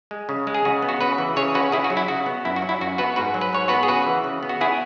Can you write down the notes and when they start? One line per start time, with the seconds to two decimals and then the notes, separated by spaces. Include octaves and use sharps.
0.11 G#3
0.29 C#3
0.47 G#3
0.54 G#4
0.65 C#3 F#4
0.82 B3
0.89 F#4
1.01 C#3 F#4 B4
1.18 E3
1.36 C#3 G#4 C#5
1.54 C#4 F#4 B4
1.72 C#3 E4 G#4
1.84 F#4
1.90 F#3
1.97 E4
2.08 C#3 F#4
2.26 B3
2.45 F#2 E4
2.56 F#4
2.62 F#3
2.69 E4
2.81 F#2 F#4
2.98 B3 F#4 B4
3.16 G#2 F#4 B4
3.34 F#3
3.41 B4
3.53 G#2 C#5
3.68 B3 F#4 B4
3.83 G#4
3.88 C#3 F#4 B4
4.06 E3
4.24 C#3
4.43 B3
4.49 F#4
4.61 B3 E4 G#4